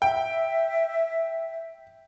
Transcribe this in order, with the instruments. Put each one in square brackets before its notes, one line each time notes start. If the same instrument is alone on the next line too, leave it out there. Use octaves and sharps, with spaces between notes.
[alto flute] E5 [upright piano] G5